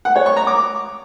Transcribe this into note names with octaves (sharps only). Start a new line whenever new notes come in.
F#5
C#5
C#6
A#5
D6